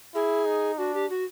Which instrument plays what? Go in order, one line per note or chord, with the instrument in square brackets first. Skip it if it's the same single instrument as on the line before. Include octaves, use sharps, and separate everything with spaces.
[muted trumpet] E4 [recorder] G#4
[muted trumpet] D#4
[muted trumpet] D4 [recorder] F#4
[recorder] G4
F#4